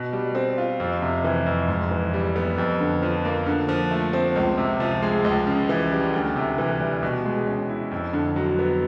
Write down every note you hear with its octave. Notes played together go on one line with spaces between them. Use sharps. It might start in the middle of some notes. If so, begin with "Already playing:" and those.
Already playing: B2
G3
C4
F4
F2
C3
E3
F2
G#2
E3
G3
B3
F2
D3
F3
A#3
D3
F3
A3
C4
C#2
C3
F3
G#3
C#2
C#3
E3
G3
D2
C3
E3
G3
B2
G#3
C#4
E4
F2
D3
F#3
B3